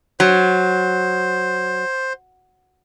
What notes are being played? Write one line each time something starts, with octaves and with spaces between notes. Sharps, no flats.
F#3 C5